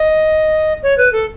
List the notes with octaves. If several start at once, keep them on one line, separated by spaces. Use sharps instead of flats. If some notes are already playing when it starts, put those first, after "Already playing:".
Already playing: D#5
C#5
B4
A4